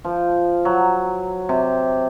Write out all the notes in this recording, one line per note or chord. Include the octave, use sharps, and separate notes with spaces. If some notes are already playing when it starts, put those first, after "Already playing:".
F3
F#3
C3